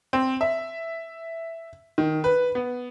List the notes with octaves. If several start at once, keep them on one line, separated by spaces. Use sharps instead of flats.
C4
E5
D#3
B4
B3